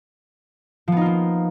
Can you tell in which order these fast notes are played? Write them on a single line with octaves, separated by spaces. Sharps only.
F3 B3 D#4 F4 A#3